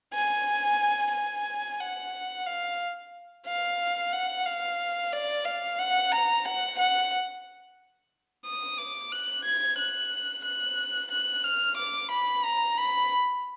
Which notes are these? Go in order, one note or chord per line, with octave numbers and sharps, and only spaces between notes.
G#5
G#5
F#5
F5
F5
F#5
F5
D5
F5
F#5
A#5
F#5
F#5
D#6
D6
F#6
G#6
F#6
F#6
F#6
F6
D6
B5
A#5
B5